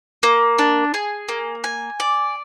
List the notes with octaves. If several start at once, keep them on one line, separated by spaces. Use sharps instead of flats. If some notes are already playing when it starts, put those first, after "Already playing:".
A#3
D4
G#4
A#3
G#5
D5